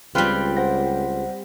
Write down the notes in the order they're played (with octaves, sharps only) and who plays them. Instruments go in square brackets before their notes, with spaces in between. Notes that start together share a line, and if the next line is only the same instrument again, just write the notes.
[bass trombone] C#2 [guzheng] G3 C4 [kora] F4 B4 F5
[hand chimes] C5 F#5 A#6